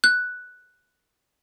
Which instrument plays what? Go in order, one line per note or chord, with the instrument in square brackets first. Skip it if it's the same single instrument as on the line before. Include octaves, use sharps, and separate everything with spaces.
[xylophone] F#6